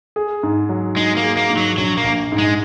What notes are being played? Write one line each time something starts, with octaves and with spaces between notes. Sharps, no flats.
G#4
G#2
F#3
G#3 D#4
A#3
G#4
A#3
G#2
F#3
A#1 F#3
A#3
A#1
G#2
G#3